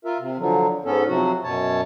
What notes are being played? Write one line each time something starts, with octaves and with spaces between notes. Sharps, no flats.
F4 A#4 E5
C3
D3 F3 F#3
G#2 B3 C#4 A4
C3 F3 F#3 F#4
F#2 B2 C#5 A5